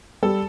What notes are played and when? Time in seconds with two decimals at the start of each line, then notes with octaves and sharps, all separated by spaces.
0.22 G3 A4